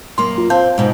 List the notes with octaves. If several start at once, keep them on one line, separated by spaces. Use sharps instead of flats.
F#2 A#3 C6
F4
C4 F5 A5 G6
G#2 B2